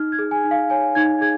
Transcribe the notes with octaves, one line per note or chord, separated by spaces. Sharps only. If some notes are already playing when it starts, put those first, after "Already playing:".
Already playing: D#4 F6
G#6
G#4
G#5
D#4
F5
C#5 G#5
D#4 G#6
G#4 G#6